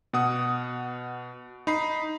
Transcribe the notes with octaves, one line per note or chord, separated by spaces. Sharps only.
B2 F#5 D#6
D#4 B5 C7